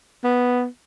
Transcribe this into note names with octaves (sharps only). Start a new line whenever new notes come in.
B3